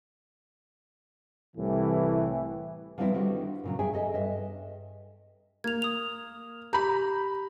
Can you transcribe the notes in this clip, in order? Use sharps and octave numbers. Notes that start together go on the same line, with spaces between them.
C2 A2 E3
F3 G3 B3 C4 E4 E5
D3 D#3 G3 F#4
A#2 C#3 F#3
G#4 E5 G5 G#5
A4 D#5 E5
G2 D#5 E5
A#3 G#6 F7
D#6 F7
G4 A#5 B5 G6